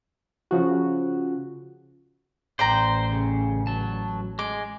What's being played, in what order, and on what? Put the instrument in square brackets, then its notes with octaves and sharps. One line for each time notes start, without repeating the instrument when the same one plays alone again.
[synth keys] C#3 F3 F#4
[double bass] A1 [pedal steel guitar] C5 [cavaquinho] D5 G5 A#5
[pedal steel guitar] C#3
F#3 A5
[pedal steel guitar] G#3 [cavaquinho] D6